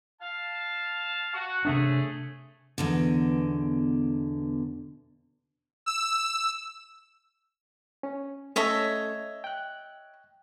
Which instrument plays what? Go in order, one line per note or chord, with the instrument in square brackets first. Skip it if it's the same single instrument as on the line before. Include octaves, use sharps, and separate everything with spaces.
[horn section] F5 A5
F#4
[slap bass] C3 C4 D4 [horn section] A3 G#4
[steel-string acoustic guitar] E2 B2 D3
[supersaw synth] E6
[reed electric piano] C#4
[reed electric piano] A3 C#4 A4 [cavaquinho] C#5 D#5 E5
[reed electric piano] G5 F#6